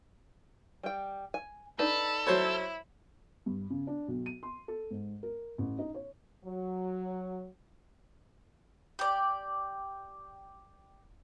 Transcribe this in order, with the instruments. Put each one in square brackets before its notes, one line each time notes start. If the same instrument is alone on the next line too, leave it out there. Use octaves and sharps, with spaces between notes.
[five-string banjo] G3 G5
G#5
[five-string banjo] D4 D#4 B4 [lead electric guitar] A4 [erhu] B5
[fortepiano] F#3 C5 C#5 [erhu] E4
[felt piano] G2
C#3
D4
B1
D#7
C6
A4
G#2
A#4
A1
D#4
C#5
[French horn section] F#3
[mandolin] G4 D5